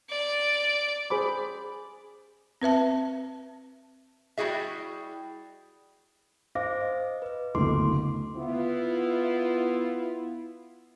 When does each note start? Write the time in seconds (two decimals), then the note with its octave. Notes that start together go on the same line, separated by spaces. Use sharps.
0.10 D5
1.10 G#4 C5 B5 D6
2.62 C4 B4 E5 A5
4.38 G3 E4 F#4 G#4 E5
6.55 C5 F5 D6 A#6
6.81 D#5
7.22 B4
7.55 F#1 D2 B3 C6 D6
8.37 B3 E4 F4